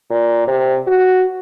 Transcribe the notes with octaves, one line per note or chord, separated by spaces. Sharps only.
A#2
C3
F#4